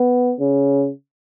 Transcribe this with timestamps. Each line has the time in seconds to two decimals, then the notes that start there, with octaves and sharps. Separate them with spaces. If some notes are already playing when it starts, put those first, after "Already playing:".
Already playing: B3
0.40 C#3